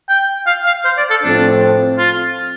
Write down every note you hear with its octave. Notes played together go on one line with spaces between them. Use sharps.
G5
F5
F5
C5
D5
A4
A2 F3 A3 C4 D4
F4